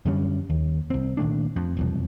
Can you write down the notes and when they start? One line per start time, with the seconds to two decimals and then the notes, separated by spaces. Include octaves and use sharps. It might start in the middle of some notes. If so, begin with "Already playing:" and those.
0.06 F#2 D3 G3 C#4
0.50 D#2
0.90 C2 C4
1.17 A#2 D#3 A3 D4
1.56 F2
1.77 E1 C2 F2